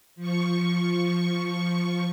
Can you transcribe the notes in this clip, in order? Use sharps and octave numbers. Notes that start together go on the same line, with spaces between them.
F3 C#6